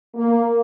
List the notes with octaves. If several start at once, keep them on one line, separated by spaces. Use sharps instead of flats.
A#3